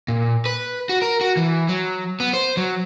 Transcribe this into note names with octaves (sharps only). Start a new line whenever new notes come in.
A#2
B4
F#4
A#4
F#4
E3
F#3
B3
C5
F#3